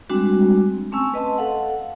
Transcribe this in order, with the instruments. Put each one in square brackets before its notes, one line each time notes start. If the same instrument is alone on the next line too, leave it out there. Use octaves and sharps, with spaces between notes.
[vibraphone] G3 G#3 C4 D4 F#4
A3 C4 C#4 G#5 C#6 E6
B4 D#5 A5 C6
A4 F5 F#5